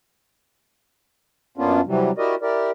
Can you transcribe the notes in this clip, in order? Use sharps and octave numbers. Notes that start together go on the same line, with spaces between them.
F#2 A#3 B3 C#4 D4 F4
C3 E3 F#3 G3
E4 F#4 G4 A#4 D5 D#5
E4 G4 A#4 D5